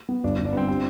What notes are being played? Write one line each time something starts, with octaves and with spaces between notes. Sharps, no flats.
B3
G1 D4
G1
D4
G2 B3 C4
G3 C4